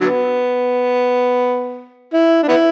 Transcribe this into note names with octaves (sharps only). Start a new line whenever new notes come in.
D3 F#3 B3
E4
D4
B3 E4